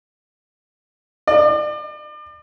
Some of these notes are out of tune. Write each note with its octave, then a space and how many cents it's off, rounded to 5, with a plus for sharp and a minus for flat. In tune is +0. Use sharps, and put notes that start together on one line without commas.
D5 +40